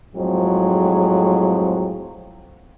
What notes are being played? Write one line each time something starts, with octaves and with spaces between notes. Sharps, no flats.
F2 A2 F#3 G#3 C4